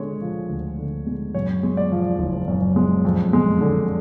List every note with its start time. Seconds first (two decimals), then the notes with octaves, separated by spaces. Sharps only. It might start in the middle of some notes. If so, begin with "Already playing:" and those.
Already playing: D3 G#3 C#5
0.21 F3
0.49 D2
0.79 D3
1.06 G#3
1.34 F#2 C#5
1.63 G#3
1.77 D5
1.92 F3
2.19 F#1
2.48 F#2
2.76 G#3
3.05 F2
3.33 G#3
3.61 D3